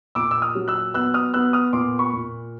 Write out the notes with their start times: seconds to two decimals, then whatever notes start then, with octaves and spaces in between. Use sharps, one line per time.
0.15 A#2 D6 E6
0.31 E6
0.42 D#6 F6
0.55 F#3
0.68 E6 F#6
0.94 B3 E6 F#6
1.14 D#6 F6
1.34 B3 E6 F#6
1.53 D#6 F6
1.73 A#2 C6 D6
1.99 B5 C#6
2.13 A#2